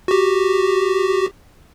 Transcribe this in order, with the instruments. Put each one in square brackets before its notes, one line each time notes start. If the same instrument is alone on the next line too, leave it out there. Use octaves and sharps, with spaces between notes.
[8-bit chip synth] F#4 G4